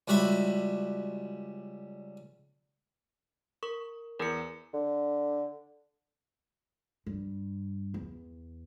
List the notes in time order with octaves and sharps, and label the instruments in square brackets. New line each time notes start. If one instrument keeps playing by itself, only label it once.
[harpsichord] C#2 G3 F#4 E5 B5
[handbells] A#4 C#6
[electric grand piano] E2 [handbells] A#4 C#7
[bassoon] D3
[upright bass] G2
E2